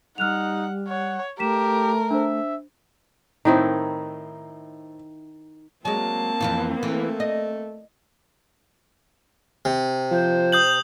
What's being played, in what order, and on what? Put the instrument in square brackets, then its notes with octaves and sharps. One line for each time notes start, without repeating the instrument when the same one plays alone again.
[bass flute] G3 [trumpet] D#4 [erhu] F#5 [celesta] F6 F#6 F7
[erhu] C#5 [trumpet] F#5
[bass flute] A3 [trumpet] G4 [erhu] A#4 [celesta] B6 E7
[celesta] D4 C5 [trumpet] E5
[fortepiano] A2 C4 [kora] D#3 D#4 E4
[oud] F#3 G#3 [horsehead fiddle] A#3 C4 [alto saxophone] A5
[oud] F2 E3 F4
[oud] E3 [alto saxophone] A3
[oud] D#5
[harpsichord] C3
[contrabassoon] F3 [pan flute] C5
[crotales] D#6 G6 F#7